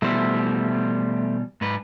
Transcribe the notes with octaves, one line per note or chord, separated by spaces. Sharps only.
B2 E3 G3 A3 C5 E5
G#2 B4